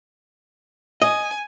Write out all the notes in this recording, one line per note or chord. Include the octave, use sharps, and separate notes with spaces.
D#5 G#5